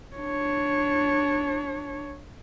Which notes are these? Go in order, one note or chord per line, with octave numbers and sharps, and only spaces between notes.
D4 C#5